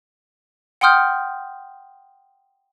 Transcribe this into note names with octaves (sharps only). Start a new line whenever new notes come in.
F#5 G5 C6 D#6 F6 G6